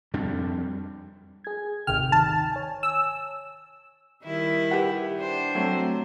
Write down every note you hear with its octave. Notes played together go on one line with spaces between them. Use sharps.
F2 G3 C4 D4
G#4 G#6
G#1 D2 C3 G5 F6
D#3 A5
C#5 G#5
E6
D#3 G3 E4
G4 B4 F#5
D4 C5
F#3 A3 C4